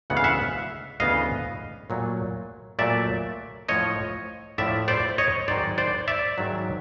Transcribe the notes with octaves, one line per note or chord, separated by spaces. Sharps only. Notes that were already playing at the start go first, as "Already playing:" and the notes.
D2 C#3 E3 G#3 B3 F#5
F5
E5 F#5
D2 C#3 E3 G#3 B3 D#5 F5
A#2 F#3 A3
A#2 F#3 A3 D5 E5
A2 F3 A3 C#5 D#5
A2 F3 A3 D5 E5
C5 D5
C#5 D#5
G#2 D#3 F#3 C5 D5
C5 D5
D5 E5
G#2 D#3 F#3